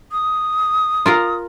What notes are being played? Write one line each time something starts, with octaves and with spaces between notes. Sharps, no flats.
D#6
F4 A#4 F5